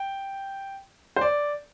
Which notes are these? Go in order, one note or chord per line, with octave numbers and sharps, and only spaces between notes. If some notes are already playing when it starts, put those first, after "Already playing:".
Already playing: G5
C5
D5